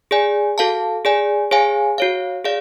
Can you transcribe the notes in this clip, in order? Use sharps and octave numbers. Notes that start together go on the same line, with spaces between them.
G#4 D5 G#5
F#4 A4 F5 A5
G#4 D5 G#5
G#4 C#5 F5 G#5
F#4 C#5 F5
G#4 D5 F5